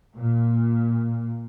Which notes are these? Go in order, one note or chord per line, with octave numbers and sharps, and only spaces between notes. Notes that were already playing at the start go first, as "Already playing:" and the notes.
A#2